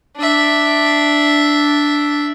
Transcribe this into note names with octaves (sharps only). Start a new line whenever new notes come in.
D4 E5